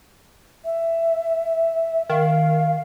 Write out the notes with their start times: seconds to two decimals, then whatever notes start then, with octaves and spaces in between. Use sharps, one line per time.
0.65 E5
2.09 D#3 F5